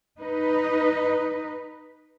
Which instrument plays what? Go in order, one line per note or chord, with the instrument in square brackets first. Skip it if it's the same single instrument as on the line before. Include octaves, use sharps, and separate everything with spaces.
[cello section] D#4 B4